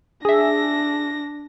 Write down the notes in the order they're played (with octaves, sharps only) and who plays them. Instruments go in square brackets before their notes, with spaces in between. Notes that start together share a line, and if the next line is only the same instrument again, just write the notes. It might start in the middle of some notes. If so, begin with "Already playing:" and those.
[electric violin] D4 A#6 [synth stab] G#4 E5